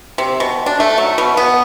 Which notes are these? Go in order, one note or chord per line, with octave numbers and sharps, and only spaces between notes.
C3
B2
D4
A3
F#3
B2
B3